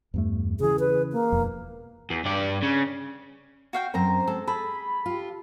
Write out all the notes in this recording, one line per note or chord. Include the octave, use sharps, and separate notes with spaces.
E2 G2 A3
C#3 E3 G#4
B4
A#3
E1 F2
E2
G2 D5
C#3
F#4 F5 G5
F#2 C4 A#4 C5 A#5
G#3 A4
G#4 A4 B5
F4 G4